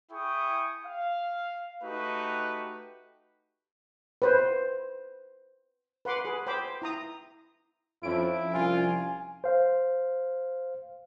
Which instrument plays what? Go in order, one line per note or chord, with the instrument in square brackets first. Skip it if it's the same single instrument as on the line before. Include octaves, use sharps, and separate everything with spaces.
[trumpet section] E4 G#4 G5 C#6 D#6
F5
A3 D#4 F#4 G4 B4
[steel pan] B4 C5
B4 F#5 C6 D6
G#4 B4
C5 G5 B5 D6
E4 A#5 D#6
[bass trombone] F2 [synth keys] F3 C#4 D7 [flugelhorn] E4
[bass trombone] C2 [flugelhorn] F4 [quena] G#5
[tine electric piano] C5 F5